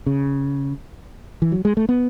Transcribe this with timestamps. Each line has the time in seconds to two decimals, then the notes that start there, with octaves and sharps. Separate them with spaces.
0.06 C#3
1.42 E3
1.52 F#3
1.65 G#3
1.77 A3
1.89 B3